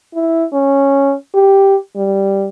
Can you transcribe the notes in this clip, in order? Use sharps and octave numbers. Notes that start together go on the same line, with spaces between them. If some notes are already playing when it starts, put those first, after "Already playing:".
E4
C#4
G4
G3